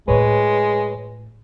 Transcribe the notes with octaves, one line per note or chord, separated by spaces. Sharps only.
A2 G#3 F4 B4 C#5